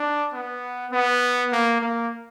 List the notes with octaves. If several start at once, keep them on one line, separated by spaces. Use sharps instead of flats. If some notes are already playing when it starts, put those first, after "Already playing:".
Already playing: D4
B3
B3
A#3
A#3